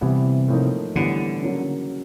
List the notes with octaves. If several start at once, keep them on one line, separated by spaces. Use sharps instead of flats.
C3 E3 G3 B3 E4
A2 F3 A#3 D#4
A2 D3 E3 G3 B3
C#3 F#3 A#3